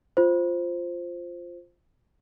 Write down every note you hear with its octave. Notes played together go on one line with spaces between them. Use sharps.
F4 C5